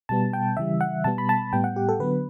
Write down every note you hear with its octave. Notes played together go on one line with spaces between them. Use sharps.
B2 G3 B3 A5
G5
C#3 E3 G3 E5
F#5
B2 G3 B3 A5
B5
A5
A2 G3 B3 G5
F#5
G4
A4
D3 F#3 B3 B4